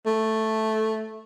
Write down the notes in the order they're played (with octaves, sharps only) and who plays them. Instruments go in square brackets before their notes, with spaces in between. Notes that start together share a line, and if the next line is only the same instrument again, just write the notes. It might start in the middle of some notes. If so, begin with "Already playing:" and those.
[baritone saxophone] A3